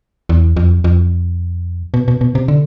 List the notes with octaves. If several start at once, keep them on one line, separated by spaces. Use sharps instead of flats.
E2
F2
F2
B2
B2
B2
C3
D3